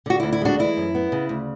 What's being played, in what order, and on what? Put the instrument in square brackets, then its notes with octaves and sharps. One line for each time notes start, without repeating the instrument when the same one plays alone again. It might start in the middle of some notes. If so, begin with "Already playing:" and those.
[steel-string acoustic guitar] D3 F#4
D2 E4
E4
G#3 D4 F#4
E3 E4
F#2
B3
C#3
D2